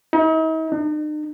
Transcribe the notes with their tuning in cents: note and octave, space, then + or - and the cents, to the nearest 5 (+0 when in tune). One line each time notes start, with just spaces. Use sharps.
D#4 +45
D#4 -45